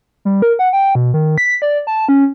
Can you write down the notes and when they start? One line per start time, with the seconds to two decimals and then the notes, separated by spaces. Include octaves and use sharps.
0.25 G3
0.42 A#4
0.59 F#5
0.73 G5
0.95 B2
1.14 D#3
1.38 B6
1.62 D5
1.87 A5
2.09 C#4